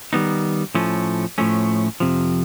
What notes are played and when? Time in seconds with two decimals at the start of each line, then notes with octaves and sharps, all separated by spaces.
0.13 D#3 G3 B3 D#4
0.75 A2 F3 A3 C#4
1.38 A2 F3 A3 C#4
2.00 F2 C3 F3